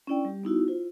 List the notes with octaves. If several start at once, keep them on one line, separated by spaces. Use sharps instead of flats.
C#4 D4 E4 D5 G5
G3 G4
B3 D#4 E4 F#4
E4 F4 C5